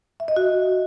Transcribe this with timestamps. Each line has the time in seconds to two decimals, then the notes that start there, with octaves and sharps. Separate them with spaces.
0.20 E5
0.28 D#5
0.37 F#4